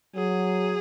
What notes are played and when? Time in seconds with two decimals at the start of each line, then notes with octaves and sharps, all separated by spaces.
0.15 F#3 G#4